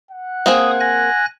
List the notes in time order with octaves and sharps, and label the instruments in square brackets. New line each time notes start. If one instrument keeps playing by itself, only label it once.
[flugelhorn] F#5
[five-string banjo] A#3 C4 G#4 [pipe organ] D#6
[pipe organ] G#5 F#6 A#6